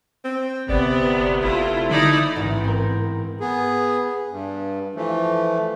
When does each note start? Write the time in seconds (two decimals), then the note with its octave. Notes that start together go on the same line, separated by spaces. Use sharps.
0.24 C4
0.69 G1 C3 B3 D5
1.42 A3 E4 F4
1.89 D3 D#4 E4 D5
2.36 A1 G#2
2.64 C4 A#4
3.40 B3 G#4
4.31 G2
4.96 E3 F3 A3